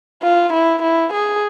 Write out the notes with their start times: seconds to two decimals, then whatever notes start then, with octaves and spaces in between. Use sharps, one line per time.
0.23 F4
0.53 E4
0.83 E4
1.13 G#4